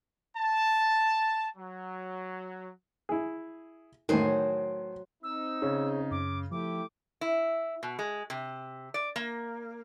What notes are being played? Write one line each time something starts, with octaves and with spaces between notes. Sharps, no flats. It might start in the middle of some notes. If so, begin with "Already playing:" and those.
A5
F#3
E4 G#4
A2 D#3 F#3 C5 G#5
C4 D#4 E6
C#3 G#4 C#5
F#2 D6
F3 A3 E4 G4 D6
E4
B2
G#3
C3
D5
A#3